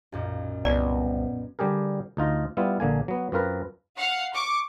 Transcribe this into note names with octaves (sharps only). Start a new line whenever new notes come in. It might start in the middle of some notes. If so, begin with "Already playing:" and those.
B1 F#2 A#2
C2 B3 D5
D3 G3 G4 G#4 A#4
D2 D#4 F4 D#5
G3 B3 E4 F4
A#1 D3 A#3 G#5
F#3 B3
F#2 C4 F4 A#4 B4
F5 F#5
C#6 D6